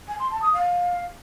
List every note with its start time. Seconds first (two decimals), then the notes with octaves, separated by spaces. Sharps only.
0.08 G#5
0.19 C6
0.31 A5
0.42 D#6
0.53 F5